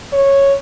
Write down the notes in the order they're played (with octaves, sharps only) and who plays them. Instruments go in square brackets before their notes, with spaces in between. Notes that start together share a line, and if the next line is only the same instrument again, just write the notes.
[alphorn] C#5